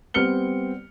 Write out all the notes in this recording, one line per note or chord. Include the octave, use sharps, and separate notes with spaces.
G3 B3 C4 F6 C#7 G7